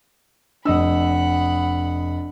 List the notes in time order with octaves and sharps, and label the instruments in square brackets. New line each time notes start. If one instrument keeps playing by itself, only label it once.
[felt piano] F1 D#5 E6 [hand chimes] D4 [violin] F#5 B5